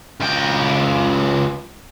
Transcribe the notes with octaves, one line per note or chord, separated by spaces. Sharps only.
C#2 G5